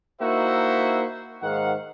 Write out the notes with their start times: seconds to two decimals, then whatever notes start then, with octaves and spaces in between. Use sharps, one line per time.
0.21 A#3 D#4 E4 F#4 C5 E5
1.43 G#2 D#3 F5 F#5